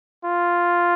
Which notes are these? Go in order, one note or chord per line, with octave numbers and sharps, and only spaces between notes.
F4